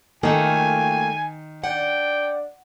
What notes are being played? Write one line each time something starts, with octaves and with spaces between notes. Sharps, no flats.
D#3 A3 A#3 F4 F#4 G5 G#5
D4 D5 F#5 G5